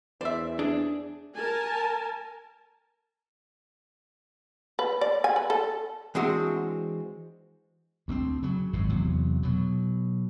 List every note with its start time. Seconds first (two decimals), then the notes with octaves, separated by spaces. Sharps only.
0.21 E2 C5 D5 E5
0.59 D4 G#4
1.35 A#4 G#5 A5
4.79 B4
5.01 D5
5.24 G#5
5.36 B4
5.50 A4
6.15 E3 G#3 C4 D4 F#4
8.08 D2 G#3 C4
8.42 C#3 F#3
8.73 G#1 F#2 A2
8.89 E2 C3 F#3
9.43 B2 F#3